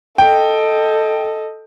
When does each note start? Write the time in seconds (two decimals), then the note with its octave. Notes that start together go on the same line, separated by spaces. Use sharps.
0.18 A4 D#5 G5